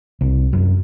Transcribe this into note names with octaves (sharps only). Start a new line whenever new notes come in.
C2
F#2